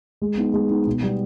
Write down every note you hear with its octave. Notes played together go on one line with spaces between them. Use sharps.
G#3
B3 D#4
G#3
B3 D#4
B2
G3 B3